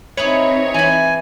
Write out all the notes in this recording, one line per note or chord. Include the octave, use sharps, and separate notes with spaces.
C4 D#4 E4 G#4 B4 C#5
E3 G#5 B5